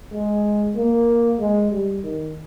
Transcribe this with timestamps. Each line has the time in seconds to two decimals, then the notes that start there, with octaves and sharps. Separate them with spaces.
0.12 G#3
0.75 A#3
1.40 G#3
1.71 G3
2.03 D#3